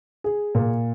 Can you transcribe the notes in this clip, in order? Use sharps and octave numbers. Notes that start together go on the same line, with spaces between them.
G#4
A#2